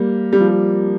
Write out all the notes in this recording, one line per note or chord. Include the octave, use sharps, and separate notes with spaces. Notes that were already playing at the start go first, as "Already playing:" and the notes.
Already playing: G3 A#3
G3
F3
G3